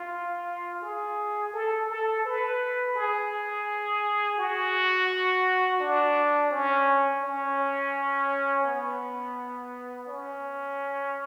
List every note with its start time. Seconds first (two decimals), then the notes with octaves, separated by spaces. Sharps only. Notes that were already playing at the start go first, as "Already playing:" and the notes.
Already playing: F4
0.82 G#4
1.53 A4
1.90 A4
2.25 B4
2.96 G#4
4.38 F#4
5.80 D4
6.51 C#4
7.23 C#4
8.64 B3
10.07 C#4